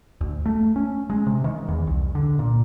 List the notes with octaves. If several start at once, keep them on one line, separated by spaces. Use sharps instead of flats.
D2
A3
C#4
G#3
C3
D#3
E2
C2
D3
A#2